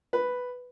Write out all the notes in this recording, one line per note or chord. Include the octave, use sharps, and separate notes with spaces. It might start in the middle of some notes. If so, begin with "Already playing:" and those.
B4